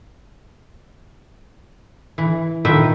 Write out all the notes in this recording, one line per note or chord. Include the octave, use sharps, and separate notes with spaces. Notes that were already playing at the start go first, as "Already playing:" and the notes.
E3
A#2 D#3 F3 B4 E5 G5